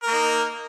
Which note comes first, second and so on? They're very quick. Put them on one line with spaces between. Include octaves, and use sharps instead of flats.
A#4 A#3 D#4